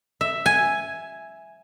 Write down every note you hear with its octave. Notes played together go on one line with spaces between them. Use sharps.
E5
G#5